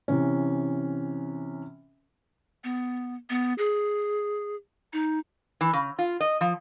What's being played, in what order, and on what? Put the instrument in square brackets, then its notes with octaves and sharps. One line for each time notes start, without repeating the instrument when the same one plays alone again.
[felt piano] C3 E3 C#4
[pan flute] B3
B3
G#4
D#4
[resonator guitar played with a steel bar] E3
C#3
F4
D#5
F3